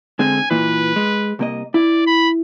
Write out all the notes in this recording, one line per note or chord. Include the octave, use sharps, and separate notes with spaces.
D3 G#3 C4 G#5
A#2 E3 B4
G#3
C2 A#3 D#5
E4 D5
B5